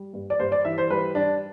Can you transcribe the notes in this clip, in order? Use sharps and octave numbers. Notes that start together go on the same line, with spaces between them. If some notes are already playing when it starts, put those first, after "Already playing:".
Already playing: G3
G2
D5
G2 C5
D5
E3 E5
C5
G3 B4
G3 D4